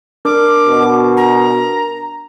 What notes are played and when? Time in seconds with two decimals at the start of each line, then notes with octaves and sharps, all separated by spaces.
0.25 D4 A#4 D6
0.67 B2
1.17 A#5